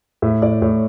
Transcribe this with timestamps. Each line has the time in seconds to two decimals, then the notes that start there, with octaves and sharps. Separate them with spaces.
0.22 A2 E5
0.42 A2 D5
0.62 A2 C#5